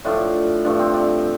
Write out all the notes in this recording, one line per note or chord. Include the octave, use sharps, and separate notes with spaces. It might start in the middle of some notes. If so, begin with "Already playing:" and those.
A2 F3 A3 D4
G2 F3 A3 D4
C4
D4